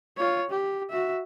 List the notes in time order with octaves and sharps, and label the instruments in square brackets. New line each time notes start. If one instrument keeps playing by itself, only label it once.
[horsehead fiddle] F4 C#5
G4
F#4 E5